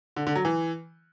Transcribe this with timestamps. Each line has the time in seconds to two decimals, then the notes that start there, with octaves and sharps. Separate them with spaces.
0.16 D3
0.27 D3
0.35 F#3
0.45 E3